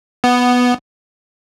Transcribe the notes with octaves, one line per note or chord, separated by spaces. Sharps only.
B3